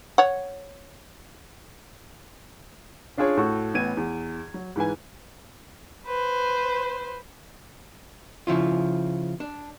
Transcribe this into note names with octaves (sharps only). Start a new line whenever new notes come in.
C#5 F#5
C#4 D4 F4 G#4 C#5
A2 F#4 A4 C#6
A1 B3 G#6 D#7
E2
F#3
G#2 E3 B4 G#5
B4 C5
C#3 F3 E4 F4
D4